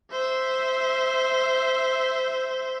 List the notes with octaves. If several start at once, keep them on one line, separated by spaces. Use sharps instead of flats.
C5 E5